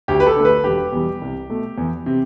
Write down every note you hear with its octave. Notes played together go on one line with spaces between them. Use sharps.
D2 G4
B4
A4
D3 A3
B4
E1 G4
E2 B2 G3
C2
B2 A3
E2
C3